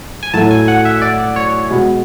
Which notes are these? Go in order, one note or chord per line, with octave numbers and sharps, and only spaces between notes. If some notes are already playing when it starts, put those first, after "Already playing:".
G#5
A2 F#3 A3 A5
G#5
F#5
E5
D5
C#5
B2 G#3 B3